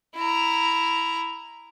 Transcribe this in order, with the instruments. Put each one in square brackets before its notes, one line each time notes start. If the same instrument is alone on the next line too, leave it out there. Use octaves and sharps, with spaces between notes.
[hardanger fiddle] E4 A#5